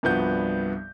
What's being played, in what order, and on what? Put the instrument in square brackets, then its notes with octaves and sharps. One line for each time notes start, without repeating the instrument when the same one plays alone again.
[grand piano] C2 G2 F3 B3 F#4 G6